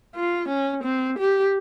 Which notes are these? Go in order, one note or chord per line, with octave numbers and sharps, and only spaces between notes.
F4
C#4
C4
G4